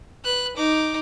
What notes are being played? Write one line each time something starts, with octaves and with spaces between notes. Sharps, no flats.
B4 F#6
D#4 D6